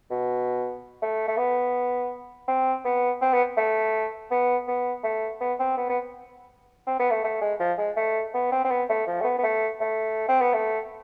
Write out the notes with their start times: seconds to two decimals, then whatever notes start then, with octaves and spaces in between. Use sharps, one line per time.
0.10 B2
1.02 A3
1.27 A3
1.37 B3
2.48 C4
2.85 B3
3.21 C4
3.33 B3
3.57 A3
4.31 B3
4.67 B3
5.03 A3
5.40 B3
5.59 C4
5.77 B3
5.89 B3
6.87 C4
6.99 B3
7.11 A3
7.24 A3
7.41 G#3
7.59 F3
7.78 G#3
7.96 A3
8.34 B3
8.51 C4
8.64 C4
8.70 B3
8.89 A3
9.07 F3
9.21 A3
9.24 B3
9.38 B3
9.43 A3
9.80 A3
10.28 C4
10.41 B3
10.53 A3